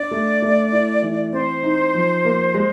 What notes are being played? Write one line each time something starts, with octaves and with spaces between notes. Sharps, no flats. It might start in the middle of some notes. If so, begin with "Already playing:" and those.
Already playing: D4 D5
A3
A3
E4
E3
C4 C5
D#4
F3
A#3
G#3